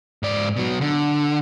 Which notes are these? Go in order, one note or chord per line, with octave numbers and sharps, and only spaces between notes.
G#2 D5
B2 F#3
D3